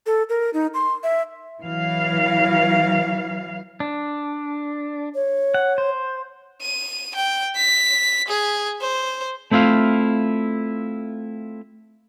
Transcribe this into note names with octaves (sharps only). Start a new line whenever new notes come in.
A4
A#4
D#4
C6
E5
E3 F#3 F5
D4
C#5
F#5
C5
D#7
G5
B6
G#4
C5
A3 C4 E4 F4 F5